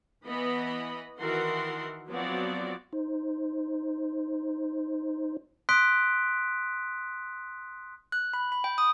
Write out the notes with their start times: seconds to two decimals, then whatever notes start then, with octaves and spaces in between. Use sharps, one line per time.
0.25 E3 B3 D#5 B5
1.19 D#3 E3 F#4 A#4 F#5 C6
2.07 F3 F#3 B3 C4 F#4 D5
2.93 D#4 C5
5.69 C6 D#6 F#6 B6 D7
8.12 F#6
8.34 B5
8.52 B5
8.64 G5
8.78 D#6